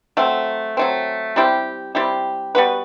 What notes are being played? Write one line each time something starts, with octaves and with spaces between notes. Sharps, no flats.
F#3 A3 C4
F#3 A3 C4
G3 C4 E4 G4
G3 C4 E4 G4
G3 B3 F#4 B4